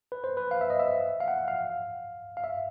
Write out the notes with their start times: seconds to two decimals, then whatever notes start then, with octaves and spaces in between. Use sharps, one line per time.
0.12 B4
0.24 C5
0.37 B4
0.51 F5
0.61 E5
0.70 D#5
0.80 E5
1.20 F5
1.28 F#5
1.48 F5
2.37 F5
2.44 E5